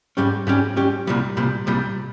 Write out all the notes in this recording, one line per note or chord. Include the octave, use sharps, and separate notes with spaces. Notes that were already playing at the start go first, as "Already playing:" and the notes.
G#2 G3 C#4 G4
G#2 G3 C#4 G4
G#2 G3 C#4 G4
C2 A#2 G3
C2 A#2 G3
C2 A#2 G3